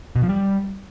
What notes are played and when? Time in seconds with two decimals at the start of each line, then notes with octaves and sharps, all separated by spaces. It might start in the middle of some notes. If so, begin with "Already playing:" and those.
0.16 B2
0.22 F3
0.29 G3